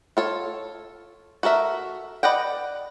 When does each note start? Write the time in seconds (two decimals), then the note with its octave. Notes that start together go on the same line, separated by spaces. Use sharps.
0.17 F4 A4 C#5
1.43 F#4 A4 A#4 E5
2.23 B4 D5 D#5 F#5 G5